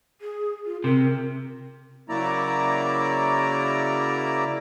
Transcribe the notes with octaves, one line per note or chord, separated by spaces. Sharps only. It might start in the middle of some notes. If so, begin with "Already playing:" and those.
G#4
F4
C3 A#4
C#3 F#3 A#3 E4 D5 A#5